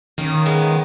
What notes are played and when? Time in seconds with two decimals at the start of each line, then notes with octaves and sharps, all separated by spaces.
0.18 D#3 A#3 C#4
0.46 G#3 B3